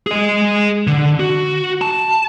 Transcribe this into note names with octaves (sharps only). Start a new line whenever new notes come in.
G#4 D#5
D3
F#4
A5